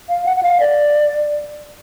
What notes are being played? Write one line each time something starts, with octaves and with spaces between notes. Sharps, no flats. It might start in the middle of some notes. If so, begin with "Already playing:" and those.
F5
F#5
F#5
F5
D5